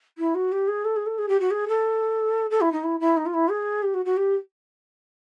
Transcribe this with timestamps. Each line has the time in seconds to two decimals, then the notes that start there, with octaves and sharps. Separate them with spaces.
0.18 E4
0.35 F#4
0.52 G4
0.68 G#4
0.84 A4
0.96 G#4
1.06 A4
1.18 G#4
1.28 G4
1.40 F#4
1.50 G#4
1.68 A4
2.50 A4
2.61 E4
2.72 D#4
2.84 E4
3.00 E4
3.17 D#4
3.26 F4
3.34 E4
3.50 G#4
3.82 G4
3.94 F#4
4.05 F#4
4.17 G4